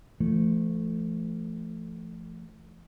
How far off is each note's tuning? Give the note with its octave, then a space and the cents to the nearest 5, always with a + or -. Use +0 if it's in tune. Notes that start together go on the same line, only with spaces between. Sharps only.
F3 -40 A3 +0